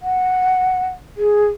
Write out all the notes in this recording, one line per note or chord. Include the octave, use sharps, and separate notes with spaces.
F#5
G#4